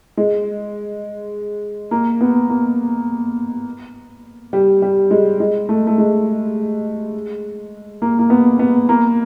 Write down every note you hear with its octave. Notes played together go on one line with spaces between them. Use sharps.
G#3
A#3
B3
A#3
G3
G3
G#3
G#3
A3
A3
G#3
A#3
A#3
B3
B3
A#3